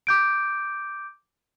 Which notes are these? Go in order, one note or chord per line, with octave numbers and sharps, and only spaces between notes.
D6 G6 D7